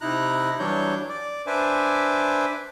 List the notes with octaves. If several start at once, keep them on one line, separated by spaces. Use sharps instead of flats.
C3 D#4 E4 A#5 F#6
E3 F#3 G3 D4 C#5 G6
D5
D4 B4 C5 E5 G#5 D6